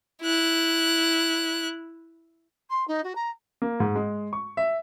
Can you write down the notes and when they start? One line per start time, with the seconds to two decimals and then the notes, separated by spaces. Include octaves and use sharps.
0.22 E4 F#6
2.69 C6
2.87 D#4
3.04 F#4
3.15 A#5
3.62 A#3
3.80 G#2
3.95 G#3
4.33 C#6
4.57 E5